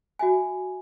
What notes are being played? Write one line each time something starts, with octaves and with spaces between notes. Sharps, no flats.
F#4 E5 G#5